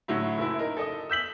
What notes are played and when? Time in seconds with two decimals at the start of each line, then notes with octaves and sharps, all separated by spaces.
0.08 A2 D3 F#3 E4
0.38 F#1 E4
0.59 D#4 A#4
0.77 A4 D#5 D#6
1.10 E6 G6 B6 F#7